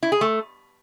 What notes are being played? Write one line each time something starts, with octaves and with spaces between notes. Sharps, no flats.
E4
G#4
A3